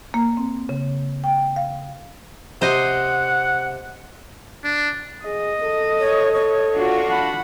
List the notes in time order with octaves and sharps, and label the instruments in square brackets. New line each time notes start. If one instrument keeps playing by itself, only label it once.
[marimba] A#3
C4
C#3
G5
F5
[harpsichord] C3 [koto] C5 D#5 [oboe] F#5
[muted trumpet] D4
[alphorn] G#4 [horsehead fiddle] D#5
[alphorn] A4
[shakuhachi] C#5
C#5
[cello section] D4 F4 F#4
[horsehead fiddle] F#5 B5 [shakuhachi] A5